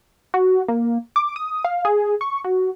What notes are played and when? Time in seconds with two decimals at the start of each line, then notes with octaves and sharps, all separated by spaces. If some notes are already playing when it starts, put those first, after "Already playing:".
0.34 F#4
0.68 A#3
1.16 D6
1.36 D#6
1.65 F5
1.85 G#4
2.21 C#6
2.44 F#4